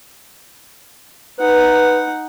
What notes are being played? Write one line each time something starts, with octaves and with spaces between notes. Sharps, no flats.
D#4 B4 F#5